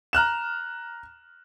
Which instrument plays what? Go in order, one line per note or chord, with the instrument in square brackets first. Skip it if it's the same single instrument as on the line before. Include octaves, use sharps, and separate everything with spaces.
[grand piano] A#5 F6 F#6 E7